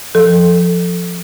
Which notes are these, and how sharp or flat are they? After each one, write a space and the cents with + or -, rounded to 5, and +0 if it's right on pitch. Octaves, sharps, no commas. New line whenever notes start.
F3 +5 A4 +0